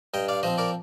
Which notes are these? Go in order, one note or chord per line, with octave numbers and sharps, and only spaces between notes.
G2 D#5 G5
D5 F5
F3 C4 C5 D#5
A#4 D5